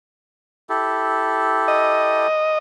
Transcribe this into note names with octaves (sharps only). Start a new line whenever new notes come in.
E4 G4 A4
D#5